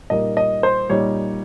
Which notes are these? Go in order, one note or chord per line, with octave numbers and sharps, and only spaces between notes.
A#2 G3 A#3 D#4 D#5
D#5
C5
A#2 G3 A#3 D#4 C#5